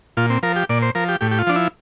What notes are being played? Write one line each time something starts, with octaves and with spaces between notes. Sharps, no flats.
A#2 F4
C4
F3 A#4
G4
A#2 D5
C5
F3 A#4
G4
A2 G4
G4
F4
F3 D4
E4